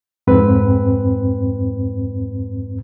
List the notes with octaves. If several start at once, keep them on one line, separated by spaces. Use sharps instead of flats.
F2 G#2 C4 B4